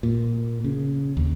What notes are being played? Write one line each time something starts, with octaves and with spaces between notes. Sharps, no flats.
A#2
C#3
D#2